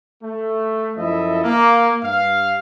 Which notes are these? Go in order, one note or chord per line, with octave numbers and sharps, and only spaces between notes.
A3
F#2 F3 E4 A4 D#5 E5
A#3
G2 F5